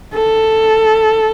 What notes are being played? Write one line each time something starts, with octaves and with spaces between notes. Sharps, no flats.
A4